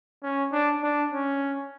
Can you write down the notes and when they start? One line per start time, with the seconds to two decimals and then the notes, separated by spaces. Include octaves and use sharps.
0.23 C#4
0.53 D4
0.83 D4
1.13 C#4